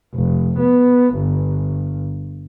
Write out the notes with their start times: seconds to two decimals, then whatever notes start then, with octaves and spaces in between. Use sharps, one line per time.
0.15 F1
0.59 B3
1.16 G1